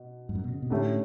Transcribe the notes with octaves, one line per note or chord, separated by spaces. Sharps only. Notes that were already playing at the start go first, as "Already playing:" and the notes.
Already playing: B2
G2
F#2
B2
C#3
B2
A2 D3 A3 C#4 G4